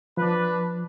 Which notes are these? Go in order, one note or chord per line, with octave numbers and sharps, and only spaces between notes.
F3 D4 B4